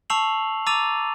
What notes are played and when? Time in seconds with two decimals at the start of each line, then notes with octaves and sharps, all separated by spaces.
0.10 A5 C#6 E6 C7 F7 F#7
0.66 A#5 D6 E6 A6 D#7 F7